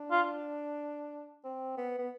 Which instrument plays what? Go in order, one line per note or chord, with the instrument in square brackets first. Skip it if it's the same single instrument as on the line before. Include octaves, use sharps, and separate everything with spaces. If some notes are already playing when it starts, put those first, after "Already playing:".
Already playing: [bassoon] D4
[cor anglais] F4
[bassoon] C4
B3
B3